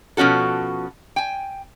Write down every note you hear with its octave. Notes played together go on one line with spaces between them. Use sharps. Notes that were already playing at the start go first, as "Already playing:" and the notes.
B2 F3 C#4 F#4 A4
G5 G#5